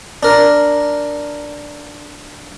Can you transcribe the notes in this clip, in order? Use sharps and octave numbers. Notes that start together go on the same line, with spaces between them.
D4 A#4